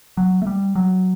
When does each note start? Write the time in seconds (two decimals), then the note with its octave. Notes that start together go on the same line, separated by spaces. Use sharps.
0.17 F#3
0.42 A3
0.46 G3
0.75 F#3